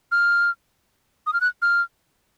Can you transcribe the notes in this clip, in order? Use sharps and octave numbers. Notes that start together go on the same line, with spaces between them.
F6
D#6
F6
F#6
F6